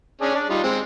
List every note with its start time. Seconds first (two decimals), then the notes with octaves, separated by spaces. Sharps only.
0.21 C#4 D4 G#4
0.35 D4 D5
0.50 G3 D#4 F4
0.64 G#3 C4